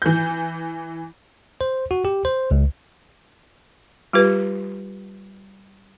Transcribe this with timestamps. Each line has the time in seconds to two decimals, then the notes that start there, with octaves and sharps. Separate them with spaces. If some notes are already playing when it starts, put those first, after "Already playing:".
0.02 E3 G6
1.61 C5
1.91 F#4
2.05 G4
2.25 C5
2.51 C#2
4.13 G3 F4 G4 B4